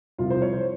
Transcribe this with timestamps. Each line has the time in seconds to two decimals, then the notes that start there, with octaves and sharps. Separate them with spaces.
0.18 C2 C3 F3 F4
0.30 C5
0.42 C#5
0.53 C5